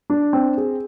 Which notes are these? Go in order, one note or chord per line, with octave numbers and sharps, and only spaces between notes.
D4
C4
G#4